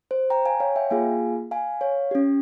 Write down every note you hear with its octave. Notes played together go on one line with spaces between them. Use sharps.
C5
G5 A#5
F5 G#5
C#5 F5
E5 G5
A#3 F4 G#4 F5 G#5
F5 G#5
C#5 F5
C#4 G4